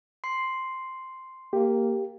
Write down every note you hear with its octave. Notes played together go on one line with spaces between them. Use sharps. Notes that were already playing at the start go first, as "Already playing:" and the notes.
C6 C7
A#3 G4